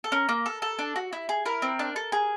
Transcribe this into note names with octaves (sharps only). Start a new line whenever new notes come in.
A4
C#4 A#4
A#3
A4
A4
D4
F#4
E4
G#4
E4 A#4
C4
D4
A4
G#4